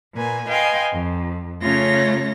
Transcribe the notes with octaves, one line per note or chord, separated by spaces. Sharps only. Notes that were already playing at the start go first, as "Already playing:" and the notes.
A#2 A#3 B4 G#5
B4 D#5 F5 G5 G#5 C6
F2
C#3 A3 C#4 F4 C#5 A#6